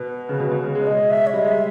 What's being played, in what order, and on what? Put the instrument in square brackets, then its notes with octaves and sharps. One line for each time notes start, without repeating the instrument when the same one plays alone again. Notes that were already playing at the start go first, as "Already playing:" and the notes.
Already playing: [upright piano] B2 [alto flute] B4
[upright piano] C#3
B2
B2
C#3
G#3
[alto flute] C#5
D#5
E5
C#5
[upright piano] G3 [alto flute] D#5
[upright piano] G#3 [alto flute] E5